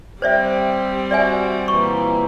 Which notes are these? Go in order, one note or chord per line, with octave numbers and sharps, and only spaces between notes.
G3 C4 G4 C5 D5 E5
F#4 D5 E5 G#5
A#2 E3 C#6